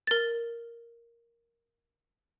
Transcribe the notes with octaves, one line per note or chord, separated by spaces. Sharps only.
A#4 A6